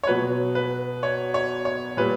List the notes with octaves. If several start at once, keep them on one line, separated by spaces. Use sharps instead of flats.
C#5
B2 F#3 B4
B4
C#5
C#5
C#5
A#2 G3 B4